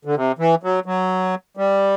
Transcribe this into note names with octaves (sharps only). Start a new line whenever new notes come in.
D3
C3
E3
F#3
F#3
G3